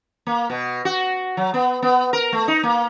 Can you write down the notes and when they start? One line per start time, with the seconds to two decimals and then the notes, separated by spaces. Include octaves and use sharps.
0.27 A#3
0.50 B2
0.85 F#4
1.37 F#3
1.54 B3
1.82 B3
2.13 A#4
2.32 A3
2.48 D#4
2.63 A#3